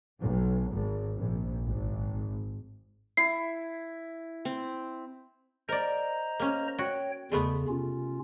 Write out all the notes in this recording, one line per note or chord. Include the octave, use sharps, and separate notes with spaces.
B1
G#1
A#1
G#1
E4 C7
C4
A#4 C5 D5 D#5 A#5
A#3 C#4
F#4 C#5 G5
E2 C#3 G#3 A3 B3
C3 C#4 F4